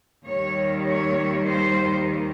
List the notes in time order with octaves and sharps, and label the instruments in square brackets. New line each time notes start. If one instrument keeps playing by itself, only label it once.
[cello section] D#2 D#3 G3 C#5
C#5
C5